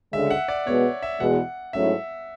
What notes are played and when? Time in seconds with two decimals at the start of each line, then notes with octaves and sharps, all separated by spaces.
0.13 D2 C#3 G#3 E5
0.30 F#5
0.48 D5
0.67 B2 G#3 B3 C#5
1.02 E5
1.20 E2 B2 G#3 F#5
1.73 G#2 F#3 A3 C#4 E4 E5